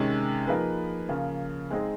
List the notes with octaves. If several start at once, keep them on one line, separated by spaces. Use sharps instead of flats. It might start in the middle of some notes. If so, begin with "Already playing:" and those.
Already playing: C3 D#3 G#3 C#4
F3 A#3 D#4 G#4 B4
C#3 F3 A#3 C#4 F4
G#3 C4 D#4 G#4